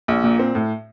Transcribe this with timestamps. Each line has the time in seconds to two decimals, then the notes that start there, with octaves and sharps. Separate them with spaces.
0.08 A#1
0.24 A#2
0.39 C4
0.55 A2